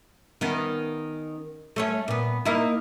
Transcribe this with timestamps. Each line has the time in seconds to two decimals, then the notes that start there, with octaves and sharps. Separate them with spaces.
0.41 D#3 B3 C#4
1.76 A3 C#4 C#5
2.08 A#2 B3
2.46 A#3 D#4 E4